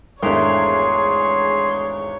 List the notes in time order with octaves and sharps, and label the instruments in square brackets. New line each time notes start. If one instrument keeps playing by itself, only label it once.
[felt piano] G#1 E2 D4 [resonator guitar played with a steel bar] A3 A#4 [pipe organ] G#4 C6 [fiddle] C#5